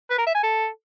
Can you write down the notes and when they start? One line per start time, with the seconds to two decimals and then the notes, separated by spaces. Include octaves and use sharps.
0.10 B4
0.18 A#4
0.27 E5
0.35 G#5
0.43 A4